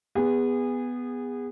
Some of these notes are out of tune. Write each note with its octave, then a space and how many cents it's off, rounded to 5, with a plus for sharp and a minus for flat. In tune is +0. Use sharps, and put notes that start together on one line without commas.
B3 +0 G#4 -25